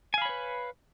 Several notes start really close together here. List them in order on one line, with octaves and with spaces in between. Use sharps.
G#5 F5 B5 C#5 B4